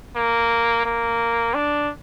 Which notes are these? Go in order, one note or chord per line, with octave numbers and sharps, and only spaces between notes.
A#3
A#3
D4